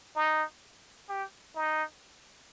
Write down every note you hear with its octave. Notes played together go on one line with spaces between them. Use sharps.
D#4
G4
D#4